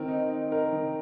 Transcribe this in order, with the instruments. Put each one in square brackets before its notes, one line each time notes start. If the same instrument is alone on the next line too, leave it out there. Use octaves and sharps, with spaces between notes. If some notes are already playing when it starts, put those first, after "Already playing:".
Already playing: [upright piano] D#3 C4 A#4
D#4
D#4
D#4 A#4
D#3